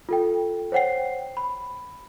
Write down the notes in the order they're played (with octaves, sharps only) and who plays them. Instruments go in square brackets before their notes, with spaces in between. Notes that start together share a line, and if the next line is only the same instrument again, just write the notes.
[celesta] F4 A4 G5
C5 C#5 F#5 G5 C7
B5